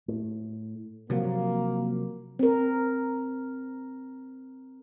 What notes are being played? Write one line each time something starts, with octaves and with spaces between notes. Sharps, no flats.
A2
C3 F3 F#3 A#3
C4 A#4